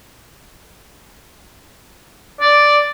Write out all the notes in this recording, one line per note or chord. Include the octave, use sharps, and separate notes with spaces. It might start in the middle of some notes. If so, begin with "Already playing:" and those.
D5